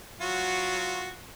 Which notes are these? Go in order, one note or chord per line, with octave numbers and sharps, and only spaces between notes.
F#3 F4 F#4